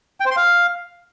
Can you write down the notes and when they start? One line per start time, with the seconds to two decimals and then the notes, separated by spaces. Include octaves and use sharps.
0.20 G5
0.26 C5
0.31 C6
0.37 F5